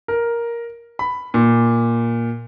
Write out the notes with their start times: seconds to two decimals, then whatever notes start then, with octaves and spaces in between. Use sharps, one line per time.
0.08 A#4
0.99 B5
1.34 A#2